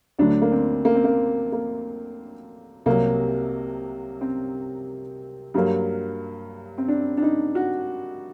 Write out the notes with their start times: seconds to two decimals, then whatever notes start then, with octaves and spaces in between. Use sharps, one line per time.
0.19 D2 D3 F#3 A3 D4
0.42 A#3
0.52 C4
0.85 A#3
0.95 C4
1.04 A#3
1.52 A#3
2.86 C2 C3 F#3 A#3
4.21 C4
5.54 G2 F#3 A#3
6.78 C4
6.88 D4
7.17 D4
7.22 D#4
7.55 F#4